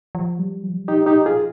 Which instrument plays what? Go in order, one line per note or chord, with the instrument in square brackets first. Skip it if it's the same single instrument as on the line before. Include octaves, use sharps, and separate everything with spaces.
[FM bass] F3
G3
F3
G3
[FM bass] F3 [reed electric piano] D#4 G4
[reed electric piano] D#4 G4
F4 G#4